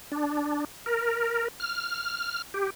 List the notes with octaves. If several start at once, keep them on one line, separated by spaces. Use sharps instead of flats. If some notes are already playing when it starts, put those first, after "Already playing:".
D4
A#4
F6
G4